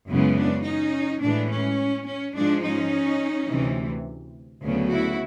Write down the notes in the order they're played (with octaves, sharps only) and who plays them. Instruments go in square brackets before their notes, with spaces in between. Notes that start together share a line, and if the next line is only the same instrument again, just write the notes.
[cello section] F#2 C#3 E3 G#3 B3
D4
C#4 D#4
A2 E3 G#3 D4
C#4
C#4
G#2 F3 G#3 D4
C#4 D#4
D2 C3 E3
D2 C#3 F#3 B3
E4 F#4